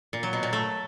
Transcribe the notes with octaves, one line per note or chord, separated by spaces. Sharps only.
A#2
F#3
B2
A#2
A3